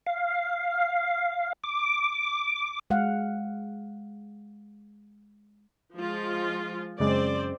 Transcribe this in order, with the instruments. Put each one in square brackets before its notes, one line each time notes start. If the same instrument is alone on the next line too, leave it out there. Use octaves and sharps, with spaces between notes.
[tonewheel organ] F5
D6
[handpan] G#3 F5 F#5
[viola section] F3 G#3 F4
[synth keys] F#2 C#3 G#3 [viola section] C4 C5 D5